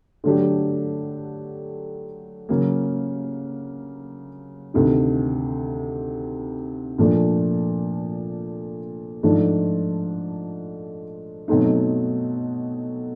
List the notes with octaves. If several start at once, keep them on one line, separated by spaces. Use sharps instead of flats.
D3 F#3 A3 D4 G4
C#3 F#3 A#3
D2 C3 D#3
A#2 F3 A3 D4
G#2 F3 A3 D4
B2 F#3 A3 C4 D#4